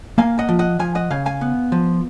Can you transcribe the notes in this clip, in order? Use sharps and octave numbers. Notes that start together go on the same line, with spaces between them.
A#3 F5 G#5
D#5 F#5
F3
D#5 F#5
F3 F5 G#5
D#5 F#5
C#3 F5 G#5
F5 G#5
B3
F3